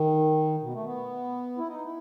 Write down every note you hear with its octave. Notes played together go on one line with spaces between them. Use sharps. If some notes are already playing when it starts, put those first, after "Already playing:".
Already playing: D#3
B2
A3
B3
E4
D#4
E4